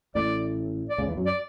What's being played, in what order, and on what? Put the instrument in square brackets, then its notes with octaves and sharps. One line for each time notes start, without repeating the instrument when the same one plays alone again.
[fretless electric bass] A1 A2 [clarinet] D5
[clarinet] D5
[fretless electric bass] C#2 C#3
E2 E3
F#2 F#3
[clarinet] D5